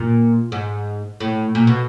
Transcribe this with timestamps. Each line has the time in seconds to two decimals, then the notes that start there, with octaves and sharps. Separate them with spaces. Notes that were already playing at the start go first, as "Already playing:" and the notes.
Already playing: A#2
0.52 G#2
1.20 A2
1.55 A#2
1.67 B2